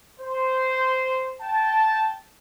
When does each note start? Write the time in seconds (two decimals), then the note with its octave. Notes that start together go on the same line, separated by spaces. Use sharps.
0.20 C5
1.41 G5 A5